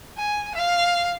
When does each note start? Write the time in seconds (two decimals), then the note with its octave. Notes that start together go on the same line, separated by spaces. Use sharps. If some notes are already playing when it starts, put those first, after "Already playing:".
0.17 G#5
0.55 F5